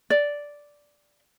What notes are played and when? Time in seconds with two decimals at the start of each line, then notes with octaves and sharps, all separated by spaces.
0.10 D5